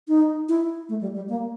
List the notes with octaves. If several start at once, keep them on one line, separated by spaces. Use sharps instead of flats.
D#4
E4
A3
G3
G3
A#3